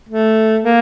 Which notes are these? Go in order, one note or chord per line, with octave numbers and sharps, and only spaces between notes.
A3
A#3